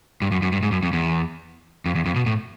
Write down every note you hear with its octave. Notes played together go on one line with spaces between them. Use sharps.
G2
F#2
F#2
G2
G#2
F#2
F2
E2
F2
E2
F2
B2
A2